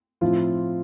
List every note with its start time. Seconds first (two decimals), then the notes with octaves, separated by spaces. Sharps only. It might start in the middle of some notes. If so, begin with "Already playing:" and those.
0.21 A2 F3 C4 E4 F4